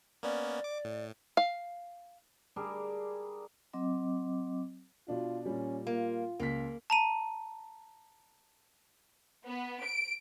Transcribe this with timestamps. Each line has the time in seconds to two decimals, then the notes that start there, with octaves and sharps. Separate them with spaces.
0.23 A#3 B3 C#4 D5
0.64 D6
0.85 A2
1.37 F5
2.56 G3 D4 G#4 A#4
3.73 F#3 C4 D#5 D6
5.08 B2 D4 F4
5.45 A#2 G3 C#4
5.87 A#3 F4
6.40 C#2 A#3 B6
6.90 A5 A#5 D#7
9.45 B3
9.83 D7